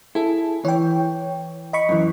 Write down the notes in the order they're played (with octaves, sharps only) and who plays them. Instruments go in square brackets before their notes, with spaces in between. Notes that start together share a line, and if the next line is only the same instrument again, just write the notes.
[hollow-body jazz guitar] E4 [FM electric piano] G#4 A4
[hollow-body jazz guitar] E3 [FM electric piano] C#5 G5
[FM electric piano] D#5 B5 C#6
[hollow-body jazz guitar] F#2 E3